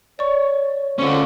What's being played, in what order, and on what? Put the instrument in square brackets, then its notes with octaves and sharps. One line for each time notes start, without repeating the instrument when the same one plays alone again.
[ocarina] C#5 [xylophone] D5 C#6
[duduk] D3 [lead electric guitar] C#4 F4 [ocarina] C5 [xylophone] C#6